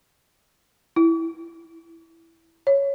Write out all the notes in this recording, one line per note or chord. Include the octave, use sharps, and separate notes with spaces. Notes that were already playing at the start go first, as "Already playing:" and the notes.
E4
C#5